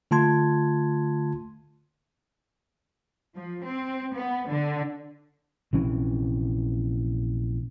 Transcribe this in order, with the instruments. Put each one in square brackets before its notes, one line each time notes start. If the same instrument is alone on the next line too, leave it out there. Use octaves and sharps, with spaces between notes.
[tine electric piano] D3 A3 F4 A5 C6 G#6
[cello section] F3
C4
B3
D3
[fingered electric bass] A#1 C3 E3 C#4